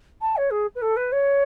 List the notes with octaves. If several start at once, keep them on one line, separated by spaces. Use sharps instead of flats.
A5
C#5
G#4
B4
A4
B4
C#5